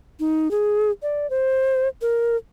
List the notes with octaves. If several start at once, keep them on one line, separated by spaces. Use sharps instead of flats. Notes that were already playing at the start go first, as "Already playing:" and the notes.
D#4
G#4
D5
C5
A#4